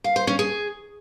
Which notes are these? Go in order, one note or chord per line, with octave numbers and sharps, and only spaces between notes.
F5
C5
C#4
G#4